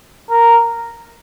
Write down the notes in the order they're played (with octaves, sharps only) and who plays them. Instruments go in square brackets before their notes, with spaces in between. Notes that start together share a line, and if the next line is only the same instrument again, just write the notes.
[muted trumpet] A#4